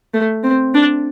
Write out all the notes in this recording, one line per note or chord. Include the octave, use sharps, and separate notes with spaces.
A3
C4
D4